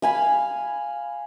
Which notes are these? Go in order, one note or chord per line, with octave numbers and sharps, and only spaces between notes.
F5 G#5 B5